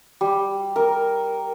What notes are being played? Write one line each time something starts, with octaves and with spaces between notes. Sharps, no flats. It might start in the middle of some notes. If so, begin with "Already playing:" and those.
G3
A#4